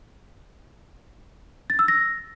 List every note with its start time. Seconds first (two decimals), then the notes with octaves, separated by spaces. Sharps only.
1.70 A6
1.79 E6
1.88 A#6